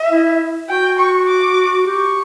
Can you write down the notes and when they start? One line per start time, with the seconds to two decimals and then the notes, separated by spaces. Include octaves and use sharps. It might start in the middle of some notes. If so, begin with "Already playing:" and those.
Already playing: E5
0.10 E4
0.69 F#4 G5
0.99 C#6
1.28 D6
1.87 G4 C#6